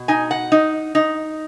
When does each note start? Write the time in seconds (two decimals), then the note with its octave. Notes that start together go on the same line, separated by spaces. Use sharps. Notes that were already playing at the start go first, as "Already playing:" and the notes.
Already playing: B2
0.08 D#4 G#5
0.31 F#5
0.52 D#4
0.95 D#4